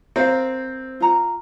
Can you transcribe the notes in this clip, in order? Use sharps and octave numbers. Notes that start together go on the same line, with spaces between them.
C4 A#4 F5
F4 A#5